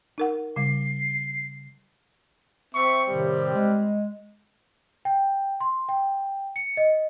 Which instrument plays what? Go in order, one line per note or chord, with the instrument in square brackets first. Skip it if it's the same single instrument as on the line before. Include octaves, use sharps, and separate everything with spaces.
[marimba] D#4 A#4 F#5
[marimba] C#3 G3 [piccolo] C7
[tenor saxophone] C4 [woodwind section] E5 [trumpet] C#6
[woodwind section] A2 C3 D#3 [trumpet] G3
[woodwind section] G#3
[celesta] G5
C6
G5
C#7
D#5